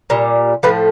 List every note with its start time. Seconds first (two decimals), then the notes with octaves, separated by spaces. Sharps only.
0.10 A#2 G3
0.63 A2 F3 A3 B4